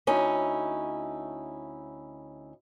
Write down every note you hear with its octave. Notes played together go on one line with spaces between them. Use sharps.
D2 C#4 D#4 E4